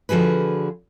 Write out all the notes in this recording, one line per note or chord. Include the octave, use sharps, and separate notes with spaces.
D3 F3 F#4 G#4 B4